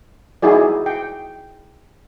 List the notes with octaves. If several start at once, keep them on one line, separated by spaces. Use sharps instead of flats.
D#4 E4 F#4 G#4 D5
G5